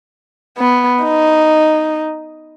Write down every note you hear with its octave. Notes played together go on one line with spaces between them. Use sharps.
B3
D#4